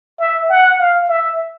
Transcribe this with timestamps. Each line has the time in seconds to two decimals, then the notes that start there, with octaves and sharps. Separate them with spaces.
0.19 E5
0.49 F#5
0.79 F5
1.08 E5